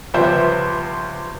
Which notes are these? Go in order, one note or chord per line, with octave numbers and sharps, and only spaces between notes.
C#2 F3 G3 B3 C5 E5